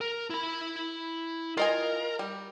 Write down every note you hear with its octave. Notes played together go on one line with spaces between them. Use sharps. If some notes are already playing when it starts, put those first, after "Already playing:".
A#4
E4 B5
F4 A#4 D#5 G#5
G3